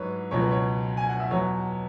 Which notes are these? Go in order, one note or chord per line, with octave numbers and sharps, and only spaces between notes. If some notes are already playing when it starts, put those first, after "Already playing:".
Already playing: G#2 F#3 B4 C#5
C#2 B2 F#3 C#5
B4
C#5
G#5
F#5
E5
E2 B2 F#3 C#5